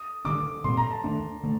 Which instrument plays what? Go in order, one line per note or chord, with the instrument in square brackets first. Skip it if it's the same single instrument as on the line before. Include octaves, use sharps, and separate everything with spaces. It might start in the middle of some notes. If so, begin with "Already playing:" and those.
Already playing: [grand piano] D#6
[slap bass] D2 D3 G3 D4 [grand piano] D6
[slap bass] A#2 G3 C4 [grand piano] C6
[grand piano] A#5
A5
[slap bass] D#2 D3 A3 D4
D3 A3